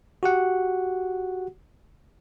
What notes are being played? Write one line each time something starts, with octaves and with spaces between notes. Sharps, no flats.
F#4 G4 F#5